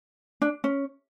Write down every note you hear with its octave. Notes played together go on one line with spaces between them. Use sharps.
D4
C#4